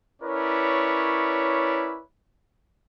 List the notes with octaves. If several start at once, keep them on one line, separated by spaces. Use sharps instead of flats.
C#4 E4 A#4 B4 C#5 D5